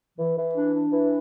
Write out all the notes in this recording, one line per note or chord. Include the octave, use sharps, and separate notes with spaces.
E3
E3
D4
D4
E3